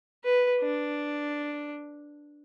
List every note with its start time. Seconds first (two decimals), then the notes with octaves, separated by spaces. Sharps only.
0.25 B4
0.62 D4